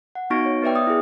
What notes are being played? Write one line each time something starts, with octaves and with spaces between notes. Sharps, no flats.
F#5
B3 D#4 F#4 C#6 A#6 D7
C#5
B3 B4 D5 E5 G5
B3 D#6
E4 G#4